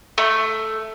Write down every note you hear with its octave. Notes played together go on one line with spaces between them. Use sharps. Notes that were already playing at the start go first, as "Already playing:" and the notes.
A3